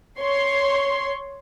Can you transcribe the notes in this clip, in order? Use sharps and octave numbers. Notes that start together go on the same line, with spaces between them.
C#5 C6